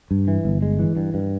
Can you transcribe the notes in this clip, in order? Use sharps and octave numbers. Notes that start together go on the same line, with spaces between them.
G2
E3
G1
G#3
E3
G2
G2